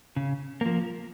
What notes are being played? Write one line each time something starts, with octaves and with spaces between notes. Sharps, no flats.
C#3
F3 A#3